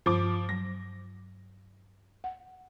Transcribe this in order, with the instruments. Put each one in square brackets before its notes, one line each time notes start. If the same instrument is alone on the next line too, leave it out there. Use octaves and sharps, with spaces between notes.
[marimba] G2 [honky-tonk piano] F3 D6
[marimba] F#3 [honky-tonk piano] A#6
[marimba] F#5